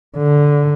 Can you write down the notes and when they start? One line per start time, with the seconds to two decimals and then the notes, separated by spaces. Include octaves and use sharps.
0.18 D3